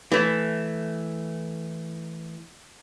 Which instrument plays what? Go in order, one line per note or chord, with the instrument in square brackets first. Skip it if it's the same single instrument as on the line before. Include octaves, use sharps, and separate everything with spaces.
[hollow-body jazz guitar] E3 A3